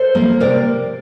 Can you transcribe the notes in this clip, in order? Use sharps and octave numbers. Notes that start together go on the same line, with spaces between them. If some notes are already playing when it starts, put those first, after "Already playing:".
Already playing: A4 C5
F3 A#3
C3 A#4 D5